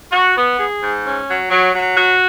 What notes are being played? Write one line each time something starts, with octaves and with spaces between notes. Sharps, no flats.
F#4
B3
G#4
G#2
C#4
F#3
F#3
F#3
F#4